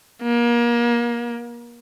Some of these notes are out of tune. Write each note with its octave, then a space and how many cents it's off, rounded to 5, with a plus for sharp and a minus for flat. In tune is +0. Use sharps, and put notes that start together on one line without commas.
A#3 +30